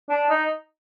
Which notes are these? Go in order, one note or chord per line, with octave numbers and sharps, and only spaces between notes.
D4
D#4